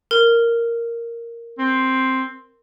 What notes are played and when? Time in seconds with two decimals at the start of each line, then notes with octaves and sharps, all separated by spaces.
0.11 A#4
1.58 C4